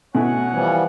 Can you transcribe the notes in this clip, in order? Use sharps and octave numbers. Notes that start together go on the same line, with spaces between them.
B2 A3 E4 C#5 F#5 G#5
E3 F3 G3